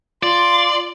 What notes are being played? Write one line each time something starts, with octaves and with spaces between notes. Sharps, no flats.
F4 D5 C6